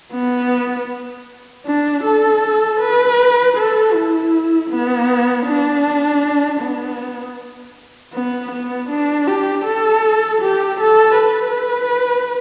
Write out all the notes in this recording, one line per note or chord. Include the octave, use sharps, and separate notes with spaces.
B3
D4
A4
B4
A4
E4
B3
D4
B3
B3
B3
D4
G4
A4
G4
A4
B4